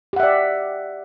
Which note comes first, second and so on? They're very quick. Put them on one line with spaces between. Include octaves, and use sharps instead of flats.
G4 F#5 E5 D5